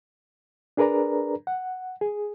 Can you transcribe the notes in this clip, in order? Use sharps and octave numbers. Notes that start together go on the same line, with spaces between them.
D4 G#4 A#4 B4 D5 A#5
F#5
G#4